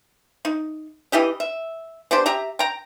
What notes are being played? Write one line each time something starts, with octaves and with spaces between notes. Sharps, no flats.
D#4
E3 E4 G4 D#5
E5
B3 D4 G4 C5
G4 E5 A#5
G5 A#5